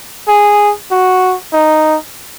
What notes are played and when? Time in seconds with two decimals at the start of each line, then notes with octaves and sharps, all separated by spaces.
0.28 G#4
0.91 F#4
1.53 D#4